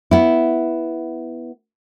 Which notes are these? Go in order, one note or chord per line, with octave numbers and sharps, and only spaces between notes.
B3 E4